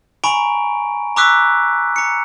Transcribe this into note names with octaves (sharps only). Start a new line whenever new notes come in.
G#5 A#5 B5 C#6 D7
A#5 C#6 D6 E6 F#6 B6
A#5 C#7